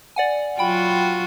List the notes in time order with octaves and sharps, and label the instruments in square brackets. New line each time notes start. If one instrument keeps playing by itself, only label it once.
[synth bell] D5 F#5 G#5
[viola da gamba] F#3 F4 F#4 [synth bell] G5 B5